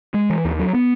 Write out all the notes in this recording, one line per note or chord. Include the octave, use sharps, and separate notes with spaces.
G#3
E3
D#2
F#3
B3